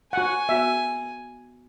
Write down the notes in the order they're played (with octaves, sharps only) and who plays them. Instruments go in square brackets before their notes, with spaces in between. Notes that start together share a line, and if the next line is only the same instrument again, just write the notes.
[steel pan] F#4 F#5 [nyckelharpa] G#5
[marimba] B3 F#4 [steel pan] E5